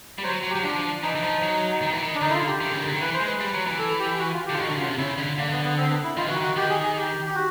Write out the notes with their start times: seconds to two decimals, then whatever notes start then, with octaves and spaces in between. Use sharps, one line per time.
0.18 G3
0.24 F#3 C5
0.43 F#3
0.50 G4
0.55 F#3
0.63 F3 D4
1.03 E3 D#4
1.15 E3
1.23 F3
1.42 F#3
1.82 D#3
1.92 E3
2.03 D#3
2.15 D4
2.21 D3 D#4
2.30 E4
2.34 F4
2.47 G4
2.61 D#3
2.72 C#3
2.81 D3
2.91 D#3
3.00 E3 B4
3.14 C5
3.20 G#3
3.27 B4
3.40 G3
3.54 F#3
3.66 E3
3.79 A4
3.99 G4
4.19 F#4
4.33 F4
4.45 D3 G4
4.54 F4
4.59 D#3 F#4
4.68 D3
4.78 C#3 F4
4.88 C3
4.98 C#3 E4
5.18 D3
5.38 D3 A#3
5.51 B3
5.64 B3
5.77 C4
5.90 B3
6.04 E4
6.17 D#3 F4
6.27 E3 F#4
6.35 D#3
6.43 F#4
6.56 D#3 G4
6.70 G#4
6.83 G#4
6.96 G4
7.26 G4
7.35 F#4